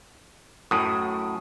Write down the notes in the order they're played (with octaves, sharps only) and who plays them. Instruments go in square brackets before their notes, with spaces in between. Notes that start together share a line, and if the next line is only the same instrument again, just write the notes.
[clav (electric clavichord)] F#2 A2 [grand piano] D#6